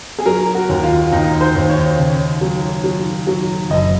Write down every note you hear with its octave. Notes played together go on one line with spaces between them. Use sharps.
G#4
F#3 A#4
F#4
D#2
F4
D#2 D#4
C5
D#2
C#5
C#3
F#3
F#3
F#3
F#1 D#5